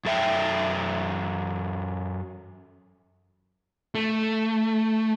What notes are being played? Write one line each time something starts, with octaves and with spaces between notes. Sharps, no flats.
F#2 A4 E5 G5
A3